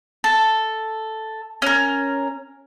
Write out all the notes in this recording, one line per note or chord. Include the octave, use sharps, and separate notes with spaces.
A4
C#4 A#4